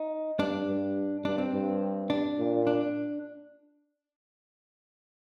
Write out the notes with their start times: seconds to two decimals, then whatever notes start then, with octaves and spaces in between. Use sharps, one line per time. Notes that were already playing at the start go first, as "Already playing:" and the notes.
Already playing: D#4
0.39 G2 D4
0.67 G2
1.24 G2 D4
1.38 C4
1.53 G2
2.10 D4
2.39 A#2
2.67 D4